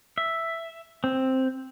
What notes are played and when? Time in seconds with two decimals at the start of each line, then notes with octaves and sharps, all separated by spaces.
0.18 E5
1.04 C4